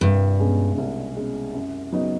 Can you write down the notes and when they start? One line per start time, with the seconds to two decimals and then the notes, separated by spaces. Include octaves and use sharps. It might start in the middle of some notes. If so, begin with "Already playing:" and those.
0.01 C2 G2
0.39 B2 G#3 C#4
0.78 C2
1.15 B2 G#3 C#4
1.54 F#2
1.92 C#3 F#3 B3 D#4